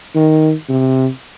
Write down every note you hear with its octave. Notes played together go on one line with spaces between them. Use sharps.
D#3
C3